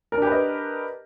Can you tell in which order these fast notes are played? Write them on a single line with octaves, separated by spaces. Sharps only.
A#4 D4 G4 B4 D#5